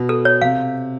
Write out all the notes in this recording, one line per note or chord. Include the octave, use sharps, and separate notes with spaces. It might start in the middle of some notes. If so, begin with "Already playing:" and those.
Already playing: B2
A4
C#5
C3 F5